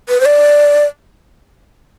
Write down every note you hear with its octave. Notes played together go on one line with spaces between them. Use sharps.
B4
C5
D5